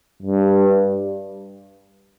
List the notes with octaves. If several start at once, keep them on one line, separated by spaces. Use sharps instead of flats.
G2